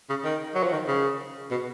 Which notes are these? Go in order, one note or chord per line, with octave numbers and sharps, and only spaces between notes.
C#3
D#3
F#3
F3
D#3
C#3
B2